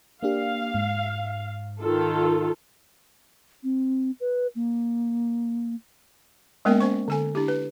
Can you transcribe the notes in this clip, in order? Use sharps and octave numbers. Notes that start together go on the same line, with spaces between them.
A#3 D4 G4 F5
G#2
D#3 F4 A4
C4
B4
A#3
G#3 A#3 B3 C#4 A#4 G5
C#4 C5 C#6
D3 A4 G#5
D4 E4 G4
B4